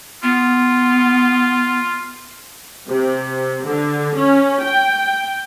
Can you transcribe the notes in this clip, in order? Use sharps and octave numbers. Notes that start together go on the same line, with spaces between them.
B3 F4
C3
D3
C#4
G5